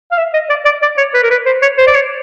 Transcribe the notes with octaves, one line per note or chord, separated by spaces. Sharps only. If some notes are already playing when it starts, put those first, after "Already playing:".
F5
E5
D#5
D5
D5
D5
C#5
B4
A#4
B4
C5
C#5
C5
D5
C#5